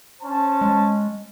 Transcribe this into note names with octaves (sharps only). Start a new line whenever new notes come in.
C#4 C5 A5
G#3